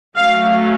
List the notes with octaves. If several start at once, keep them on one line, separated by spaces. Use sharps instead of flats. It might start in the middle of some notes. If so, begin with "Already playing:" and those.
F#3 A3 C#4 F5